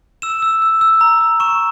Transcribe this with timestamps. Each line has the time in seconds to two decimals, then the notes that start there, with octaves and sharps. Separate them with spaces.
0.22 E6 E7
0.42 E6
0.62 E6
0.81 E6
1.01 A#5
1.21 A#5
1.40 C#6 E7